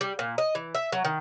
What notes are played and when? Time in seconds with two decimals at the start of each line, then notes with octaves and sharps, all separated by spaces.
0.01 G3
0.19 A#2
0.38 D#5
0.55 E3
0.75 E5
0.92 F#3
1.05 D#3